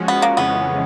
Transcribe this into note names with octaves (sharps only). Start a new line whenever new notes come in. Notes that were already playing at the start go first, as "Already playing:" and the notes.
Already playing: F3 G#3 C#4 F#4
B3
A#3
F2 C#3 E3 G#3 B3 C#4